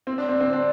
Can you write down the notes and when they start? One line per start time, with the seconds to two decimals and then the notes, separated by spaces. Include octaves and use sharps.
0.07 C4
0.18 D4
0.29 C4
0.41 C4
0.53 D4